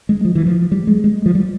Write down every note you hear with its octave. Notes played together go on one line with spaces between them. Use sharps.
G#3
F3
E3
F3
G3
G#3
G#3
F3
G3